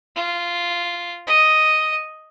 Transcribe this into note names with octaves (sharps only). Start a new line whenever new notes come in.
F4
D#5